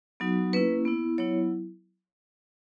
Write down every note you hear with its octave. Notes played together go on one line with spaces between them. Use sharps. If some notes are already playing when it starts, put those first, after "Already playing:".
F#3 B3 D#4 F#4
A#3 C#4 E4 B4
B3 E4
F#3 B3 E4 C#5